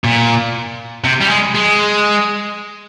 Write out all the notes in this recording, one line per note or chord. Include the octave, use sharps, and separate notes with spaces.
A#2
C3
G3
G#3
G#3